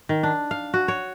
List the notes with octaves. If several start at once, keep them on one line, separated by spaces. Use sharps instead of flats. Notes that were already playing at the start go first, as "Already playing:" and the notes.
D#3
D4
F5
F#4
C#5